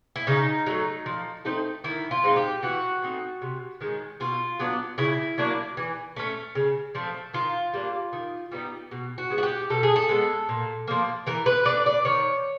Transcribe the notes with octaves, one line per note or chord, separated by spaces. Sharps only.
E4
C#3 D#4
F#3 A3
F3
A3 C4 D#4
D#3 E4
F4
G#3 C4 D#4
G4
E3 F#4
A3 C4 D#4
C3
D#3 G#3 C#4
B2 F4
F#3 B3 D4
C#3 E4
F#3 A#3 D4
E3
A3 C#4
C#3
F3 A3 C4
D#3 F4
G3 A#3 D4
D#3
G3 B3 D#4
B2
F#4
G#3 B3
F#4
G4
B2 A4
G#4
A4
G#3 B3
A#2
F3 A#3
E3 A#4
B4
A3 D4 D5
D5
D#3 C#5